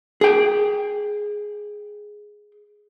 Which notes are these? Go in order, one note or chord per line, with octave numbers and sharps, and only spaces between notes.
G#4 G5